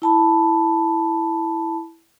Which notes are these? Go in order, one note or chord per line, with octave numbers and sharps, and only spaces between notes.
E4 A5 B5